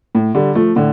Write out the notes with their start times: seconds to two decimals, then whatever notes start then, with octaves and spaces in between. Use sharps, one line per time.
0.15 A2
0.35 D3 G3
0.55 F3 A3
0.76 A2 D3